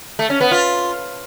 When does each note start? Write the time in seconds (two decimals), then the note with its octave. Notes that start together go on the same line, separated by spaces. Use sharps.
0.19 A3
0.30 C#4
0.41 B3
0.51 F4